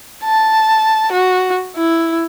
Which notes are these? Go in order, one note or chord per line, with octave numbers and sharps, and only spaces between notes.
A5
F#4
E4